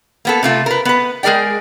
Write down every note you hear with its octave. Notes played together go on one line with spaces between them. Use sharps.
A#3 B3 A4
C3 A3 F4
A#4 B4
B3 B4
G#3 G#4 A#4 D5 G5